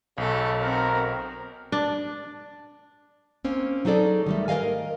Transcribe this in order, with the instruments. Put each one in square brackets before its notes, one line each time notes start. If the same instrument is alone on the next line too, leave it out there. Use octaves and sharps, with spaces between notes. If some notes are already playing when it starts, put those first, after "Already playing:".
[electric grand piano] B1 [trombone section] C#3 A3 [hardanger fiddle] A4
[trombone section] D#3 A#4 [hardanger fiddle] C4 F#4
[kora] D4
[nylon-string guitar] A#3 C4 C#4
F#3 D#4 G#4 A4 D5
D#3 G3 A3
A#4 C#5 D#5 F5 G#5